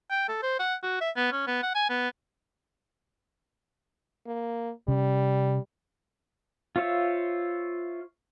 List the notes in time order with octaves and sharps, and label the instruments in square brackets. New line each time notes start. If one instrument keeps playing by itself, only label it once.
[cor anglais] G5
A4
C5
F#5
F#4
E5
B3
C#4
B3
F#5
G#5
B3
[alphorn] A#3
[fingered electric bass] C3 C#4 [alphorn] G3
[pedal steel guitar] F4 C5 C#5 E5 F5